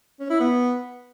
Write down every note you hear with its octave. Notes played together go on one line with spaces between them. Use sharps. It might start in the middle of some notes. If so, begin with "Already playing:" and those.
C#4
E4
B3